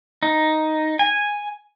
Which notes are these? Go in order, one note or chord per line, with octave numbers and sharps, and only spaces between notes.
D#4
G#5